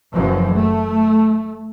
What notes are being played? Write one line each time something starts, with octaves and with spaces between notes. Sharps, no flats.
F#1 F#2 E3 F3
A3